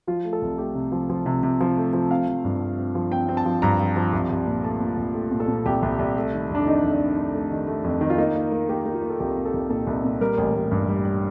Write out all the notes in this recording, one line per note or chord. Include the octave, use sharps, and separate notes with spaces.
F3 F4
A3
A4
C2
A3 G4
C3
F3
F3
C3
C3
F3
A3
F3
C4 F5
F3
G2
C4
C4
F3
C4 G5
C4
A5
F3
G2 A#5
F3
F3
C2
C2
A#2
A3 A5
A#2
C2
A3
A#2
A4
A#2
C2 G4
C2
C2
A3
D#3
F2
D4
D#3 D#4
F2
D4
A3
A3 D4
A3
D#3
A3
F2
D#3
F4
A#3 D#4
A#3
A#3
A#3 G4
A#3
F4
A#3
A4
C2 G4
C2
A4
C2
A#2 A4
C2
A#2
G3 A#4
A1
A1
G2
G3
G3